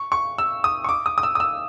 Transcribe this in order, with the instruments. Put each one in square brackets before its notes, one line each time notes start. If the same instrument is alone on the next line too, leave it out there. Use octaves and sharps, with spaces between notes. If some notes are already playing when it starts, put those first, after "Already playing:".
Already playing: [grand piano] C#6
C#6
E6
D#6
C#6
D6
D#6
D#6
E6
D#6
E6